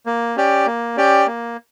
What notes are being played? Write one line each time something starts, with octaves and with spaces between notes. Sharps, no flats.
A#3
C#4 G4 D5 G5
A#3
C#4 G4 D5 G5
A#3